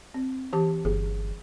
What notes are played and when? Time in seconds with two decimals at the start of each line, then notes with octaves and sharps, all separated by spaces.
0.14 C4
0.53 E3 G4 A5
0.85 G1 G#4